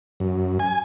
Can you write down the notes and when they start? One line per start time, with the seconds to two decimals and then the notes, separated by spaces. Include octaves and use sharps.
0.20 F#2
0.59 G#5